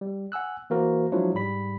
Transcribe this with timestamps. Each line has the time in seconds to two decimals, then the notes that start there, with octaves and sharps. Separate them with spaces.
0.01 G3
0.32 F#5 G#5 E6 F#6
0.70 E3 A#3 F#4 A#4 C5
1.12 F3 F#3 G#3 D4 E4 F4
1.34 G#2 G3 B5 B6